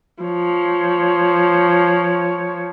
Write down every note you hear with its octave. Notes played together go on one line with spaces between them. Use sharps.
F3 C#5